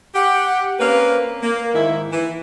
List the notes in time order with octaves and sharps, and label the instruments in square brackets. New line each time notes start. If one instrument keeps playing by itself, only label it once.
[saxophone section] G4 F#5
A#3 C4 C#4 B4 F5
A#3
G#2 D#3 E4
E3